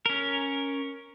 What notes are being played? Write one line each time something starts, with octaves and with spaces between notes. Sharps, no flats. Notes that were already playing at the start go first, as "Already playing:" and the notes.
C#4 A#4